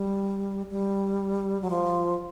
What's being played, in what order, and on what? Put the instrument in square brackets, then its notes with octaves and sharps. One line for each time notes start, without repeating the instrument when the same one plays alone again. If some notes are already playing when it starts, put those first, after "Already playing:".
Already playing: [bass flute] G3
G3
F#3
F3